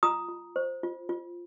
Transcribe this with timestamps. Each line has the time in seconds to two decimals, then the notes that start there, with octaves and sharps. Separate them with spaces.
0.03 F4 A#5 D#6
0.29 F4
0.56 C5
0.83 F4
1.09 F4